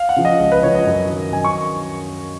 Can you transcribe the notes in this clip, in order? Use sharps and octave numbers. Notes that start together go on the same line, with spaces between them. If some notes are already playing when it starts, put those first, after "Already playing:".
Already playing: F5
F#5
C#3 F3
D#5
C#2
B4
C#3 F3 C#5
D#5
F#2
D#3
F#2 G#5
C#6